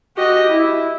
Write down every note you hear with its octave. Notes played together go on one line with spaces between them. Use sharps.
F#4 G4 D#5
E4